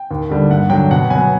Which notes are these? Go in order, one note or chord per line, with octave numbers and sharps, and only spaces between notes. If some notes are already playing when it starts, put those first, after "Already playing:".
Already playing: G5
D#2
D3 G3
G2 F#5
D3 F#3 G5
B2 F#5
F#3 B3 G#5